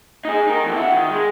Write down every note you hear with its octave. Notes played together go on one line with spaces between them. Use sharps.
D#4 G#4
D#4 A#4
F2 E3
E4 F#4
D#3
G#3